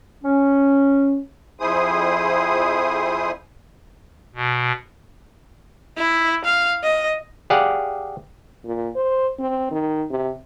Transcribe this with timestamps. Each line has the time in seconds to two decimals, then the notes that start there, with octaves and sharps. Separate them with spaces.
0.23 C#4
1.60 F2 E4 G#4 C5 D#6
4.35 B2
5.97 E4
6.45 F5
6.83 D#5
7.50 G4 G#4 D5 F5 F#5
8.65 A#2
8.96 C5
9.39 C4
9.71 D#3
10.10 C3